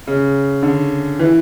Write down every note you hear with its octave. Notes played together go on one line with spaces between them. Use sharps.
C#3
D3
E3